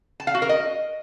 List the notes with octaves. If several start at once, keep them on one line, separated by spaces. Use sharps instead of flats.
A5
F5
F#4
A#4
D#5